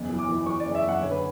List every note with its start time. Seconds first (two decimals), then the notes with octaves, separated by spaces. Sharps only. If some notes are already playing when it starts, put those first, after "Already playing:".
Already playing: F#1 E2
0.09 E3
0.19 D6
0.29 E3
0.46 E3 C#6
0.60 D5
0.65 F#1
0.75 E5
0.84 F#1 F#5
1.03 D3 C#5
1.11 B4